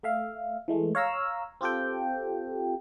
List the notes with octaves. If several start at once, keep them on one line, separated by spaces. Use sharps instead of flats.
A3 E5 F5
E3 G#3 A3
C#5 F5 A#5 E6
C4 F4 G4 A4 G5